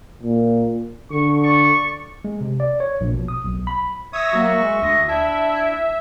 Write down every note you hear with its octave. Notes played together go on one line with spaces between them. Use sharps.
A#2
D3 C#6
D5 C#6
G#3
C3
D5
C#5
A#1
B2
D#6
B1
B5
C#5 E5 C#6 D#6 E6 A#6
F#3 A#3 F#4
G#3
D2 D#5
D4 E4 E5 A5